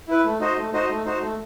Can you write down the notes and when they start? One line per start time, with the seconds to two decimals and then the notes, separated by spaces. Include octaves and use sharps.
0.08 E4 B4
0.25 A3
0.40 D#4 F#4 C5 D#5
0.57 A3
0.73 D#4 F#4 C5 D#5
0.90 A3
1.05 D#4 F#4 C5
1.22 A3